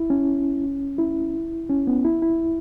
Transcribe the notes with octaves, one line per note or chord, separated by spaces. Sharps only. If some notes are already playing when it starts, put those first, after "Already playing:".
Already playing: E4
C#4
E4
C#4
B3
E4
E4